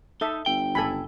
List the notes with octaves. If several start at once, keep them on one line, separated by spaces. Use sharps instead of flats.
D#4 A4 E5
G1 G5
F#1 A4 G#5 B5